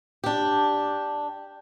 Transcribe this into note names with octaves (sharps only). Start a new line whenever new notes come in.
D4 G4